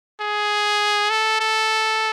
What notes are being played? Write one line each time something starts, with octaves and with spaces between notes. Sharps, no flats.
G#4
A4
A4